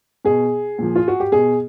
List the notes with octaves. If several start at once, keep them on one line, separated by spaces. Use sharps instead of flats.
B2 G#4
A#2 F3
F4
F#4
G4
B2 G#4